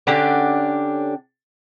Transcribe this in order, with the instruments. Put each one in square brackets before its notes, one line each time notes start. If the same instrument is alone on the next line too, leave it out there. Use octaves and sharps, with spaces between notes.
[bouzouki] D3 C#4 D4 G4